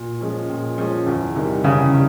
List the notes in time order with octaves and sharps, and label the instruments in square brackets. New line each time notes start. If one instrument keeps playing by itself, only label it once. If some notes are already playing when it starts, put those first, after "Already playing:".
Already playing: [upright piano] A#2
F3 G#3 C#4
A#2
F3 G#3 C#4
E2
C3 D#3 G3
[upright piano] E2 [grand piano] C#3
[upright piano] G3